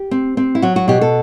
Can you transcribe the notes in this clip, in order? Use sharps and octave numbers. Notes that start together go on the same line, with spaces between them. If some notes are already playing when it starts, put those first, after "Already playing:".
Already playing: G4
C4
C4
E4
F#3 F#4
F#4
B2 G4
A4